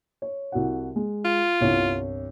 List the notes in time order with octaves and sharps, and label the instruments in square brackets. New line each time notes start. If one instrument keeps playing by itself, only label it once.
[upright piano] C#5
C2 F#4 F#5
G#3
[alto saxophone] F4
[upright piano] G1 C2 C#5